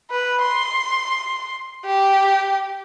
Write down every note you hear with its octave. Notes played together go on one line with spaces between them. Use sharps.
B4
C6
G4